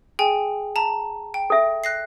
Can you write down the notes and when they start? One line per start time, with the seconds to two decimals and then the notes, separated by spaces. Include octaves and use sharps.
0.19 G#4 G5 G#5
0.76 A5 A#5
1.34 G5
1.50 A4 E5
1.84 F#6 A#6 C7